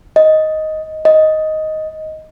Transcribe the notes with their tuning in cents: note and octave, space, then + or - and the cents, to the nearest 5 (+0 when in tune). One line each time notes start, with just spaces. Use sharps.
D#5 +5
D#5 +5